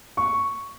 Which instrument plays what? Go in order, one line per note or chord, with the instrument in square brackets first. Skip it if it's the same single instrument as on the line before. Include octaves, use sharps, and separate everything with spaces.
[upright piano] C#6